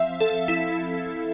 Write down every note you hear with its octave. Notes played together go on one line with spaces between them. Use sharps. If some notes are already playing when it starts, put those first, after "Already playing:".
Already playing: F3 C4 E5 F5
A4
E4